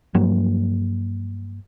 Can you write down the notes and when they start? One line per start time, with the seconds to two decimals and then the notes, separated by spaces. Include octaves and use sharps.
0.15 G2 F3 F#3 A#3